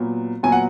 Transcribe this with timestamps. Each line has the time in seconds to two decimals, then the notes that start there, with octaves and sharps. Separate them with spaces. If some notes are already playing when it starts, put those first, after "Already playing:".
Already playing: A#2 F#3 B3
0.43 A#2 F#3 B3 G#5
0.52 F#5